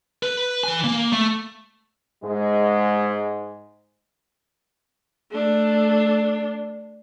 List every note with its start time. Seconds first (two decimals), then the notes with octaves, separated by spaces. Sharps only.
0.23 B4
0.63 E3 G#5
0.84 A#3
1.12 A3
2.24 G#2 G#3
5.30 A3 D4